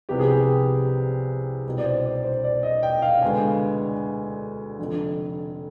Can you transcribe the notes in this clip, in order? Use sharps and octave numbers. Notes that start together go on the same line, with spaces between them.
C2 C3 F3 B3 G4
G#4
G4
C2 B2 G3 B3
D5
C5
D5
C5
D5
D#5
G5
F5
D2 D3 G#3 B3 G#5
F1 F2 D3 F3